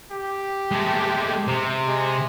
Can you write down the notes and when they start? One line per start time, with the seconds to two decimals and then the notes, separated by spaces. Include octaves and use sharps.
0.11 G4
0.71 G#3 A3
1.48 C3
1.87 G#3